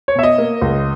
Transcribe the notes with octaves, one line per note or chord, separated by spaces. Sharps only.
C#5
B2 E5
D#5
A#3
C#2